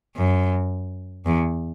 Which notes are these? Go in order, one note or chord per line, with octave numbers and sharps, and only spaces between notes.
F#2
E2